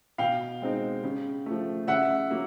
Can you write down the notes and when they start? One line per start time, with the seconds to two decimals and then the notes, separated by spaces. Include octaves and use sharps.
0.18 B2 F5 G5
0.62 G#3 C4 D#4
1.04 C#3
1.46 F3 A3
1.88 C#3 E5 F#5
2.31 F#3 A#3